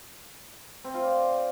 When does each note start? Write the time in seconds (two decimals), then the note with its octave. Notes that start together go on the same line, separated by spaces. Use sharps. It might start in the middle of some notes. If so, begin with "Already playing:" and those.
0.84 C4
0.94 F4
1.04 D5